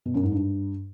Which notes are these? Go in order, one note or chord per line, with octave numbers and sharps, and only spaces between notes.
B2
F#2
G#2
G2